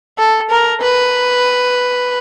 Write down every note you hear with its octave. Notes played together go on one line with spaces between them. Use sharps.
A4
A#4
B4